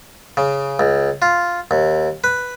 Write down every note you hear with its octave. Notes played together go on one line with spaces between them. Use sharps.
C#3
C#2
F4
D#2
B4